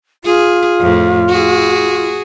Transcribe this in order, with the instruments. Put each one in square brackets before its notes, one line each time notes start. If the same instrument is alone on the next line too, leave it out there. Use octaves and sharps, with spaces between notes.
[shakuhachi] F4 [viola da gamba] G#4
[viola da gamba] F2 A2
F#4 G#4